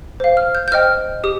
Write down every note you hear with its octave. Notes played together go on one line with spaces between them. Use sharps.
C5 F5
F6
G6
G6
C5 D#5 G5 F6
G4 D#6